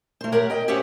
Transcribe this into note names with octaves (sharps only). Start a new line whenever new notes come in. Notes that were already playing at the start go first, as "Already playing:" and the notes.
A3 C5
G4 A#4 C#5 F#5
D#5 G5
C#4 G4 C5 C#5 E5 F#5